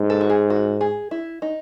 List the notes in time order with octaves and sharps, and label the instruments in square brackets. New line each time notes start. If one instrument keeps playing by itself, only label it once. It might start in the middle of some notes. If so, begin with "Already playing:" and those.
Already playing: [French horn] G#2
[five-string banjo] A4
F#4
G#4
F#4
G#4
E4
D#4